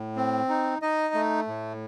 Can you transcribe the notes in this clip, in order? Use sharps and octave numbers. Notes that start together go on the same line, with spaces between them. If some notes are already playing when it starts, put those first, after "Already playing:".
Already playing: A2
C4
D#4
D#4 D#5
A3
A2